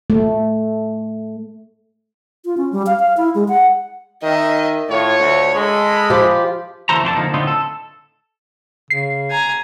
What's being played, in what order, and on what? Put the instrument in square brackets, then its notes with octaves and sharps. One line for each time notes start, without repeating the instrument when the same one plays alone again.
[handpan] A3
[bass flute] F4
C#4
G3
F5
F5
E4
G#3
F#5
[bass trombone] D#3 [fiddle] D#5 E5
[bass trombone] A2 [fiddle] F4 [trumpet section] C#5
[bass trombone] D2
[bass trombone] G#3 [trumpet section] A4 D#5 [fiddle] B5
[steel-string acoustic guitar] F3 F4 G4
[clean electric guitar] D2 E3 A3 A4 C5 A#5
F2 A#3 D4 F#4 A4 A5
D3 F3 A#3 D#4
A2 D3 B3 C4 D#4 F4
A4
[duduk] C#3 [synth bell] C7
[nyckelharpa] G#5 A#5